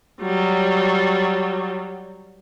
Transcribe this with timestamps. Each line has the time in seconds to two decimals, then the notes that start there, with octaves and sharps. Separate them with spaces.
0.20 F#3 G3